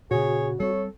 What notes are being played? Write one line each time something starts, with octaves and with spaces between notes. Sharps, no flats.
A#2 C#3 F#4 G#4 C#5
G3 C4 A4 C#5